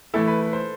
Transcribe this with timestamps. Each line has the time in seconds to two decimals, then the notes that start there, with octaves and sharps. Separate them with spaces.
0.14 E3 A3 E4 A4
0.27 B4
0.41 B4
0.53 C5